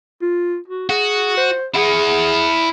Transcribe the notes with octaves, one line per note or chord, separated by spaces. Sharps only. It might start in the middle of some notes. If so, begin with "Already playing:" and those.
F4
F#4
F#4 G#4
C5
E4 G#4 F#5